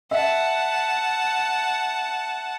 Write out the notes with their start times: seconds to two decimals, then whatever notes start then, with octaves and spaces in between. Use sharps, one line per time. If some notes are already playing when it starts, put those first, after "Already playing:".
0.11 E5 F#5 A5